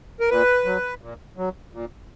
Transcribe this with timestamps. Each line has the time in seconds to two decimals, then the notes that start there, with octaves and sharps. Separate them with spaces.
0.20 A#4
0.30 A#2 B4
0.65 F#3
1.01 A#2
1.37 F#3
1.73 A#2